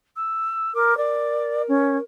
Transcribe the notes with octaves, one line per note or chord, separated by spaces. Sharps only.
E6
A#4 D6
A#4 D5
C#4